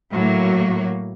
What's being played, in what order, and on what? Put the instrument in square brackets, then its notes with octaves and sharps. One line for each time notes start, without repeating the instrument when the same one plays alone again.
[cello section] A2 F#3 A#3